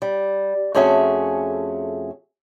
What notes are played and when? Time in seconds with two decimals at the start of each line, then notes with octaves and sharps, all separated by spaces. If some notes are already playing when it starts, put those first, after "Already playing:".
0.02 G3
0.75 F2 A3 C#4 F#4 G#4 E5